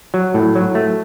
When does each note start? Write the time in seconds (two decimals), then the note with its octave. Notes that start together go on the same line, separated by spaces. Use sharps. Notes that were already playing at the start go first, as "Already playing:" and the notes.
0.14 F#3
0.34 A2
0.55 F#3
0.75 A3